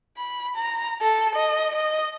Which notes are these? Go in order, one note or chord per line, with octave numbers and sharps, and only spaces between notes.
B5
A#5
A4
D#5
D#5